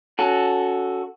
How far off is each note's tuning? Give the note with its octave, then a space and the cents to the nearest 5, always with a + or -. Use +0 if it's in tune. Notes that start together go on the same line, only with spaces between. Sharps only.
C#4 +20 F#4 +0 A4 +0